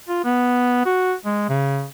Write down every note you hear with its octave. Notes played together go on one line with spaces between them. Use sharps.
F4
B3
F#4
G#3
C#3